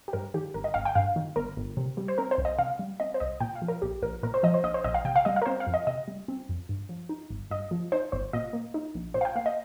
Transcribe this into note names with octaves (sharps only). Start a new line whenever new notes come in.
G4
G2 A#4
D#3 G4
G1 A#4
D#5
G1 F5
G5
G2 F5
D#3
G1 A#4
G1
C3
G3
C5
C4 A#4
C5
C2
D#5
C3 F5
G3
C4 D#5
C5
C2 D#5
A#2 G5
F5
F3
A#4
A#1 G4
A#1 A#4
A#2 A#4
C5
F3 D#5
C5
A#1 D#5
C5
A#1 D#5
F5
C3 G5
F5
G3 D#5
F5
A#4
C4 C5
F5
F2
D#5
C3 D#5
G3
C4
F2
G2
F3
D#4
G1
G2 D#5
F3
D#4 C5
G1 C5
A#2 D#5
A#3
D#4
A#1
A#2 C5
F5
G5
A#3 F5
D#5